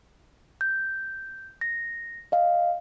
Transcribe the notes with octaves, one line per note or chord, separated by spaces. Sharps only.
G6
A#6
D#5 F5